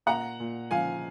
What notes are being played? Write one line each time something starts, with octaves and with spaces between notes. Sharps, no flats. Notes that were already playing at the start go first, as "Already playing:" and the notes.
A#2 F#5 A#5
A#2
F3 F5 G#5